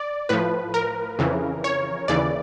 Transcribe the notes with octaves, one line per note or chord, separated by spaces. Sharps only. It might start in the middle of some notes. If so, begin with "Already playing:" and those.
Already playing: D5
A2 F3 B4
A#4
F2 C#3 E3
C#5
D#2 C#3 E3 D5